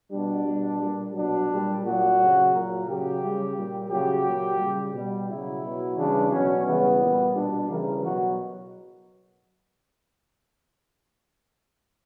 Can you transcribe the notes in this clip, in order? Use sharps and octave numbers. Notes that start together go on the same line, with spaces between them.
B2 G3 D4
B2 G3
A#2 G3
B2 F#3 D4
A#2
G3
A#2 F#3 F#4
C#3 F#3
A#2 F#3 A#4
C#3 F#3 G4
C#3 G3
A#2 G3
C#3 F#3 G4
A#2 F#3
C#3 G3
B2 G3
C#3 F#3 E4
B2 F#3
C#3 E3 G3 D4
B2 F#3 C#4
C#3 E3 G3 B3
A#2 G3
B2 G3 D4
C#3 E3 G3 A#4
B2 F#3 F#4